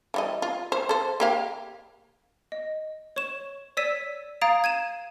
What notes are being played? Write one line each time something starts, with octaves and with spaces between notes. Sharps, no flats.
E3 G3 D#5
F4
C5
A4 C5
A#3 G4 F5
D#5
C#5 C#6 E7
C#5 D5 E6 B6 D#7 E7
F5 A#5 D#6 G#6 A6 D7
G#6 D#7 E7